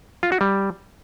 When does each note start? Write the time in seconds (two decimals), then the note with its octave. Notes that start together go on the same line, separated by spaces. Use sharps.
0.23 F4
0.32 F#4
0.41 G3